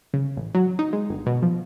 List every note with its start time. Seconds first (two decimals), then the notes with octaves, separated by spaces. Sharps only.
0.14 C#3
0.37 A1
0.55 F#3
0.79 D#4
0.93 G#3
1.09 G1
1.26 B2
1.42 F3